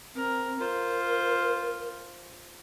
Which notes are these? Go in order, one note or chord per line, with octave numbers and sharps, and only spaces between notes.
C4 A#4
F4 A#4 C5